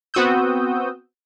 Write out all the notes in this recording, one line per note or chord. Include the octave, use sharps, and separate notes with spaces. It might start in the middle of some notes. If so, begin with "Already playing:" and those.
B3 C4 F#4 D#6 E6 G6